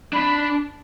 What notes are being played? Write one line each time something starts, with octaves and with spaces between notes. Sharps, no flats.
D4 B5